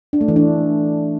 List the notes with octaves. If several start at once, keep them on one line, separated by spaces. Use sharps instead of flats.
D4
A3
E3
D4